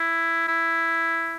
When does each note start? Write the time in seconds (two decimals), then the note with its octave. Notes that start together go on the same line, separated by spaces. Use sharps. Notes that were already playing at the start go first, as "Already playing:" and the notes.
Already playing: E4
0.48 E4